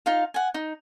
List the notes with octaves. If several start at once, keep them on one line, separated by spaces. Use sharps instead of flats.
D#4 F4 F5
F#5 G#5
D#4